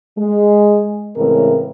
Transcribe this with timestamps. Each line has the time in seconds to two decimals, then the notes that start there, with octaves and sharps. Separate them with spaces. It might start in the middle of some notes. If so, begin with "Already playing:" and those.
0.18 G#3
1.16 A2 C#3 E3 G#3 C4 A#4